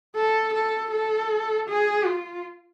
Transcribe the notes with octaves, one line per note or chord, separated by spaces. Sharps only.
A4
A4
A4
G#4
F4